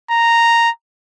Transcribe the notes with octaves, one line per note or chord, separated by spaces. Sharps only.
A#5